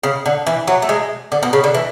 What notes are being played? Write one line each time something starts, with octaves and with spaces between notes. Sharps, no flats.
C#3
D3
E3
F#3
A3
G#3
D3
B2
C#3
D3
E3